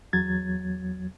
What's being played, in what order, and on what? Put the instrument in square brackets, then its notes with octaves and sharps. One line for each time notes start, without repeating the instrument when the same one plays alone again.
[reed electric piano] E2 F#3 G#6 A6